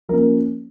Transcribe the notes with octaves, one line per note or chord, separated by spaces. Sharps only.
F3 A#3 C#4 A#4